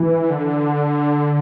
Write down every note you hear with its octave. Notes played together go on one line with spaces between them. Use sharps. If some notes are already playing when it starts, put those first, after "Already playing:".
Already playing: E3
D3